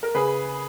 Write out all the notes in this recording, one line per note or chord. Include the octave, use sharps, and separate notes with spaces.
A#4
C#3 G#4 B4